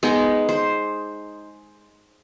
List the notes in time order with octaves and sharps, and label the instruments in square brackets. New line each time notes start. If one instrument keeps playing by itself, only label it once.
[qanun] G#3 B3 D#4
C5